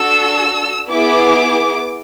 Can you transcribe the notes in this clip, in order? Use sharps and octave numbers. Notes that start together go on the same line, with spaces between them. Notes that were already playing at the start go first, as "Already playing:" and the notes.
Already playing: D4 F#4 A4 E6
B3 E4 G#4 D6